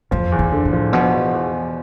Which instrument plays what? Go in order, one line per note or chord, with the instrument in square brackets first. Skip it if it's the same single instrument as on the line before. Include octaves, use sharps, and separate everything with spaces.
[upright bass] F2 [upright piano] F3
[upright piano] E2
[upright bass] F2
[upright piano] D3
[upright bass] A2
[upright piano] F3
[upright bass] B2 [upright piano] F3
[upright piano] E2
E2
E2